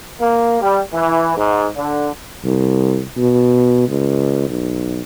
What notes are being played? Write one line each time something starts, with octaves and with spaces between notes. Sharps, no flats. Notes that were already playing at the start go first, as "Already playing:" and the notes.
A#3
G3
E3
G#2
D3
C2
B2
C#2
B1